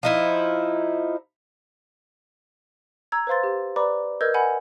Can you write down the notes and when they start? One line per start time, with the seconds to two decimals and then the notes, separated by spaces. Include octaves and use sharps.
0.03 F3 D#4 E4
3.12 A#5 E6 G#6
3.27 B4 C5 F5 C6 A6
3.43 G4
3.76 B4 D5 A#5 B5 D6
4.21 A#4 B4 D#5 E6 G6 G#6
4.34 F#5 G#5 B5